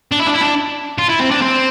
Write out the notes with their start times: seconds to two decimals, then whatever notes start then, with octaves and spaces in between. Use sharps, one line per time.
0.11 D4
0.19 E4
0.27 D4
0.34 E4
0.41 D4
0.99 F4
1.09 E4
1.20 C4
1.31 D4
1.42 C4